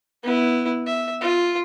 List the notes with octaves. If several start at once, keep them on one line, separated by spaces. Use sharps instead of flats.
B3 E4
E5
F4